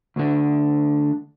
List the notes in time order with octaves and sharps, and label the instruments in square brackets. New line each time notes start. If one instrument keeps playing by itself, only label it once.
[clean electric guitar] D2 D3